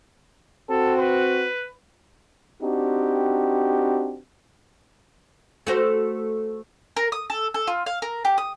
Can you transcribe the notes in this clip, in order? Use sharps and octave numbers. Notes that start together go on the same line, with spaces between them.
C4 F#4 A4
B4
C4 D4 D#4 F#4 G4
A3 F#4 C5
A#4
D#6
A4
A4
F4
F5
A#4
G4
D#6